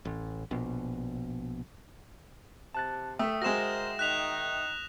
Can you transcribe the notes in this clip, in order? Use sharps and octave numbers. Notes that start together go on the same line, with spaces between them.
A1
A#1 B2
C3 A5 F#6 A6
A3 E5 G5 D#6
G#3 F#4 A#4 C5 A#6 E7
D#3 D#4 F#6 B6 F7